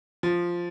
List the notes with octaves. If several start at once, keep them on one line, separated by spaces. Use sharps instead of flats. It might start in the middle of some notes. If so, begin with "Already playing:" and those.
F3